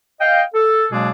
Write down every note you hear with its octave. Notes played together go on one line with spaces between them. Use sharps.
D#5 F5 G5
A4
B2 F#3 G#3 A#3 D4 G#4